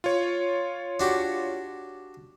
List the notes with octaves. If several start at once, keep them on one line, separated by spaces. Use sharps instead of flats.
F4 C#5
D4 F#4 G4